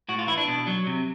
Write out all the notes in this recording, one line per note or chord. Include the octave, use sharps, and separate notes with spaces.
A2 F#4
F4
E3 E4
D4
B2
F#3
C3